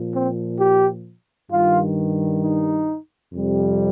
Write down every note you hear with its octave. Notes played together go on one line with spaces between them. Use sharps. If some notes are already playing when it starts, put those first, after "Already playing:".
Already playing: A#2 F3
C4
G4
G2 D#3 G3 F4
D#4
F2 C3 G3